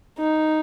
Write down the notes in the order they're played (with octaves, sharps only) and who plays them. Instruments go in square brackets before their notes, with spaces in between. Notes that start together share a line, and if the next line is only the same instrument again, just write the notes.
[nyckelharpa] D#4